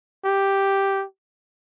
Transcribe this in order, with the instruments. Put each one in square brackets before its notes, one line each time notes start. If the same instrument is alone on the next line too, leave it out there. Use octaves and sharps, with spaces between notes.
[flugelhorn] G4